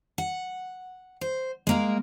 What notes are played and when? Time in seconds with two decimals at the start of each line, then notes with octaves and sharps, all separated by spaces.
0.18 F#5
1.21 C5
1.67 G#3 A#3 A#4